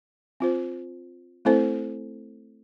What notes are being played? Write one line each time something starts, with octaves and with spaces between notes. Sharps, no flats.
C4 F4 C5
A3 C4 E4 A4 C5